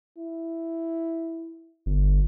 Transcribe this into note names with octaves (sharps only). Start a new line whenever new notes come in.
E4
G1